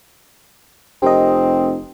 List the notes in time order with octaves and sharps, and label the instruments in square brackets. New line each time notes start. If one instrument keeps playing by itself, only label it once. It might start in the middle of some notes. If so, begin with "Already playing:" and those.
[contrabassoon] F1 [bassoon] C4 [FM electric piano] G4 A#4 D#5